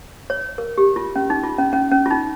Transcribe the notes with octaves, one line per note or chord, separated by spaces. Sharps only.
C#5
A#4
G4
F4
C#4
D#4
F4
C#4
C#4
C#4
F4
D#4